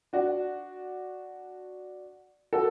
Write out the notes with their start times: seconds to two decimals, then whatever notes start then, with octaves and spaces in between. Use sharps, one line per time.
0.13 D4 F#4
2.53 F#4 A4